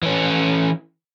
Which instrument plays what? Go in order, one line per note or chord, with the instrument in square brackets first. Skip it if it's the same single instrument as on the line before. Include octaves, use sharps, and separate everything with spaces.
[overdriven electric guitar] E3 C#4